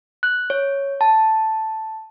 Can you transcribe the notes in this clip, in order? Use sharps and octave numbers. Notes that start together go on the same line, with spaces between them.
F#6
C#5
A5